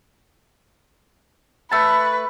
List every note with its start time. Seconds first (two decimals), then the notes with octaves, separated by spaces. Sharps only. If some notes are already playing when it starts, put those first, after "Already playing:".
1.72 A3 B4 A5